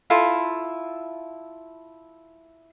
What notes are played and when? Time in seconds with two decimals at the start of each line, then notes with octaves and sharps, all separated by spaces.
0.10 E4 F4 A4